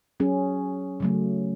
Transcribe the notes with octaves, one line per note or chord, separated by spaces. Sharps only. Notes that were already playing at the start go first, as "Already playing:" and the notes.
F#3 C#4 G#4
C#3 F#3 A3